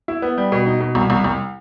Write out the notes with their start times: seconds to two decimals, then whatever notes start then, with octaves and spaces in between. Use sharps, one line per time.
0.08 E4
0.22 B3
0.38 G3
0.52 B2
0.66 D#4
0.80 B2
0.95 C2
1.10 C2
1.24 C2